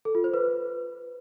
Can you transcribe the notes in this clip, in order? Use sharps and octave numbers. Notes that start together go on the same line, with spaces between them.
A4
F4
C5
B4